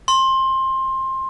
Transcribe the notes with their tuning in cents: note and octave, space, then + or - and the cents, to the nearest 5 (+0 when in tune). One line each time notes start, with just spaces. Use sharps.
C6 +20